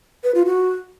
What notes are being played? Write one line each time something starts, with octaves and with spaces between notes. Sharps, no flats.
B4
F4
F#4